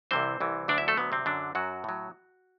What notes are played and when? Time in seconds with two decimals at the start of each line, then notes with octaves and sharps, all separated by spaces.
0.11 C2 C3 E3 C4 C5
0.40 C2 C3 E3
0.68 D2 D3 F#3 D4 D5
0.78 E4 E5
0.88 A3 A4
0.97 D2 D3 F#3 B3
1.12 C3 C4
1.26 F#2 D3 F#3 D4
1.55 F#2 F#3 F#4
1.84 A2 F#3